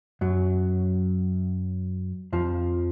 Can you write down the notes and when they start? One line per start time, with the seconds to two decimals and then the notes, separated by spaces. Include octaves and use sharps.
0.21 F#2 F#3
2.33 F2 F3